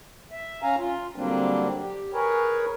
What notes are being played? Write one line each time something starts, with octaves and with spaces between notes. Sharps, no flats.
E5
C#4 F5 G#5 A#5
F4
D3 F#3 G3 A#3 C4 D4
G4
G#4 A#4 B4 C#5